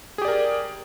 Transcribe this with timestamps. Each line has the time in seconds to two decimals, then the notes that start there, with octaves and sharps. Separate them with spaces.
0.18 G#4
0.22 G4
0.25 D5
0.28 A#4